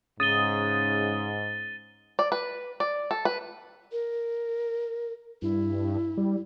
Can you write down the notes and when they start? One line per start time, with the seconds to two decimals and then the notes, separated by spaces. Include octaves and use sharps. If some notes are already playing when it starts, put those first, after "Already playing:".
0.20 G#2 C#3 D#6 A6 D#7 G7
2.19 D5
2.32 B4
2.80 D5
3.11 A4
3.25 B4
3.92 A#4
5.42 G2 E4
6.17 G3